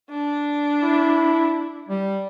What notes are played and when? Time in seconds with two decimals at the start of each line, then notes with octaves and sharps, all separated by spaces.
0.10 D4
0.82 E4
1.88 G3